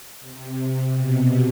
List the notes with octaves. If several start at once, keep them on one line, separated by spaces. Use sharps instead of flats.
C3
B2